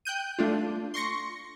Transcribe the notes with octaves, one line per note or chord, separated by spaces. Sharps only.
G5 F#6 G6 D#7
A3 D4 F4
C6 C#6 A#6 C#7